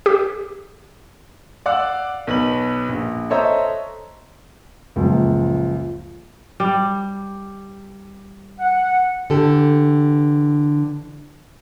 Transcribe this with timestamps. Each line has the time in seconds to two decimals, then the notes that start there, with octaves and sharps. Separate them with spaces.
0.06 G4
1.66 D5 F5 F#5 D6 E6 F#6
2.27 B1 B4 B5 F#7
2.89 A#1
3.30 A4 C5 C#5 D#5 E5 A#5
4.96 C#2 F#2 A#2 F3
6.60 G3
8.59 F#5
9.30 D3 E3 G4 A4